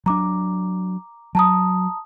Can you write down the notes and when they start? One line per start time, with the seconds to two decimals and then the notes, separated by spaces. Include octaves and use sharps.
0.06 F#3 D4 A#5 D6
1.35 F#3 A5 A#5 D#6